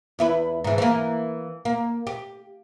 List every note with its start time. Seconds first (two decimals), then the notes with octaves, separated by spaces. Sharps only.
0.19 E2 E4 B4
0.64 G#2 E3
0.78 E3 A#3
1.65 A#3
2.07 G4